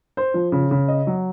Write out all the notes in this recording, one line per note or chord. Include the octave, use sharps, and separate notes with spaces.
C5
F3
C#3
C#3
D#5
F#3